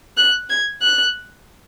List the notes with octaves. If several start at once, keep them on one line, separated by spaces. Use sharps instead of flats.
F#6
G#6
F#6